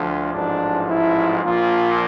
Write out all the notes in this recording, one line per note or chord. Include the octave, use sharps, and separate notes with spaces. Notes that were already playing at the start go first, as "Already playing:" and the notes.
Already playing: D2 D3 F3
A1 G#2 F3 D4
E4
A#1 A#2 F3 F4